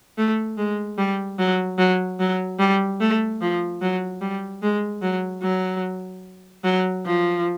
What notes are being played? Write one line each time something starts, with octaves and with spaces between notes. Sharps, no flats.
A3
G#3
G3
F#3
F#3
F#3
G3
A3
F3
F#3
G3
G#3
F#3
F#3
F#3
F3